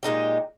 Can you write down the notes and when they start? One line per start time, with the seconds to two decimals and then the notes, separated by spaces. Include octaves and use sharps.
0.03 A#2 G#3 D#4 G4